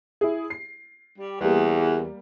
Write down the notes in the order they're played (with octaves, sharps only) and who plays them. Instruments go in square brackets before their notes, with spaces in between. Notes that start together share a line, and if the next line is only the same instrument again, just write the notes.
[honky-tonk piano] E4 G#4
C7
[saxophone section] G3
[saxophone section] E2 [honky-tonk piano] G3 A#3